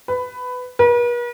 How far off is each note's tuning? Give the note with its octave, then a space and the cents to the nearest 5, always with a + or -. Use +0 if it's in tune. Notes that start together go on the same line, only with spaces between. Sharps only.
B4 +15
B4 -45